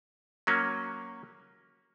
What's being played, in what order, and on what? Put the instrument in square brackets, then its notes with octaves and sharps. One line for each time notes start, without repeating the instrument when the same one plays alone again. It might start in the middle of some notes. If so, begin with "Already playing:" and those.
[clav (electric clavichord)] F#3 A#3 C#4